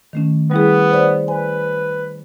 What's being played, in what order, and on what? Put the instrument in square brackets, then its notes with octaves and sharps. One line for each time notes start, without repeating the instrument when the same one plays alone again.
[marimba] D#3 A3 C#4
[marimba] G3 E4 G#4 [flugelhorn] B3
[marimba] C5 D5
[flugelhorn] B4 [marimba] G#5